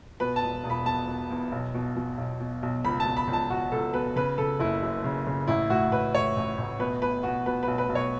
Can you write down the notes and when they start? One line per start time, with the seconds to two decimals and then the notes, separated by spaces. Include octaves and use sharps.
0.20 B2 B4
0.36 A5
0.43 E1
0.64 E1
0.70 B5
0.85 B2 A5
1.07 B2
1.30 E2
1.52 B1
1.74 B2
1.96 B2
2.18 B1
2.40 B2
2.63 B1
2.84 C#2 B5
3.00 A5
3.05 B2
3.17 B5
3.27 C#2
3.33 A5
3.50 C#2 F#4
3.72 C#2 A4
3.94 B2 B4
4.16 C#3 B4
4.38 C#3 A4
4.59 F#1 E4
4.83 F#2
5.04 C#3
5.27 C#3
5.47 A1 E4
5.70 A2 F#4
5.92 A1 B4
6.14 A2 C#5
6.36 A1
6.58 A1
6.79 B2 B4
7.02 B2 B4
7.23 B2 F#4
7.46 B2 B4
7.63 B1 B4
7.78 B4
7.89 B1
7.95 C#5